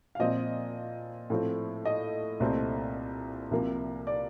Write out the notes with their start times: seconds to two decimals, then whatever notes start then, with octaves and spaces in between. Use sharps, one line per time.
0.15 F5
0.19 A#2 F3 C4 D#5
1.30 A2 F3 C4
1.85 D#5
2.40 C2 A#2 A3 C4
3.51 C2 C3 F3 A#3
4.07 D5